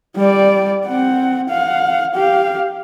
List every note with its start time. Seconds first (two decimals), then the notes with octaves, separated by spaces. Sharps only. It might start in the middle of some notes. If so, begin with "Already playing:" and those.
0.16 G3 D5
0.86 C4 F#5
1.50 F5 F#5
2.15 G4 F5